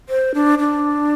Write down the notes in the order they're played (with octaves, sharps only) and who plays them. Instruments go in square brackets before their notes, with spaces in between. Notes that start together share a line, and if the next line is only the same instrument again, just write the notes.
[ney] C5
D4
D4